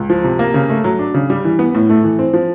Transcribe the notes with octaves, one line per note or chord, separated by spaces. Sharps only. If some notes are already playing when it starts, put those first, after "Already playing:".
Already playing: C#2
F3
C3
A#3
C#3
A3
F#3
D4
C#3
G3
E3
B3
A2
A3
E3
C4
F3